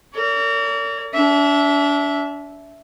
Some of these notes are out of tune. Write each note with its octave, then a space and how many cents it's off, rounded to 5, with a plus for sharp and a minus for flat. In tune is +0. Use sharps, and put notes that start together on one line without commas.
A#4 -35 D5 -45
D4 -35 E5 +0